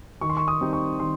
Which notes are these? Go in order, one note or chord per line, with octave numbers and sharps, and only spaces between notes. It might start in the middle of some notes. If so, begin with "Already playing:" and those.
D#3 C#6
C6
C#6
D#6
G3 C4 D#4
C#6
D#3 C6